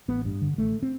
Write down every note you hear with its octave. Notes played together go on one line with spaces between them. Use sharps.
A1 B3
G2
D3
A1 A3
C4